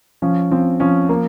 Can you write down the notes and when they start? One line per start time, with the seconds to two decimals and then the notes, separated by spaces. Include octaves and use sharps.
0.22 F3 C#4
0.51 F3 C4
0.80 F3 C#4
1.09 A#3